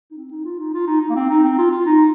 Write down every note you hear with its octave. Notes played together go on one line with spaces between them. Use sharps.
D#4
C4
D#4
F4
D#4
F4
D#4
D#4
A#3
C4
D#4
C4
F4
F4
D#4